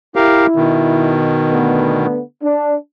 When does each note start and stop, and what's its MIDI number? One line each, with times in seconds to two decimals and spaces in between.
0.16 1.19 64
0.16 0.46 67
0.16 0.46 70
0.16 0.46 77
0.56 2.06 47
0.56 2.06 51
1.51 2.20 50
1.51 2.20 57
1.51 2.20 59
2.43 2.75 62